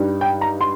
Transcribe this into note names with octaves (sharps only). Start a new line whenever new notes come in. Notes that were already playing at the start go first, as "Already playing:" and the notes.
Already playing: G2 G3 D#4
G5
A#5
C6